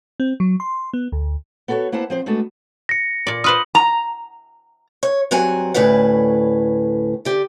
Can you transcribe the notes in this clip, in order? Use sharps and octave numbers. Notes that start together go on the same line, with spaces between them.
C4
F#3
C6
B3
D2
B3 F#4 A4 A#4 C#5
A#3 B3 E4 C5 F#5 A5
F3 C4 C5
G#3 A3 B3 D4 F#4 A4
A#6 C#7
A#2 D5
F4 B4 C5 D#6 F#7
A#5
C#5
G2 F#3 C4 F#5 G#5
D2 A2 C#4 B4 F#5
D3 G4